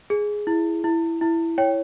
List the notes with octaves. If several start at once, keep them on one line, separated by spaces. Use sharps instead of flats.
G#4
E4
E4
E4
C#5 G5